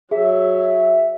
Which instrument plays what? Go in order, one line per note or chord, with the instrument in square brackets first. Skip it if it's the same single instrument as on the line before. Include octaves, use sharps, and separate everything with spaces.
[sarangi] F#3 [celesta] G#4 [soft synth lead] E5